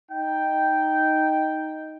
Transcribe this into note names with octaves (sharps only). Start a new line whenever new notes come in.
D#4 G5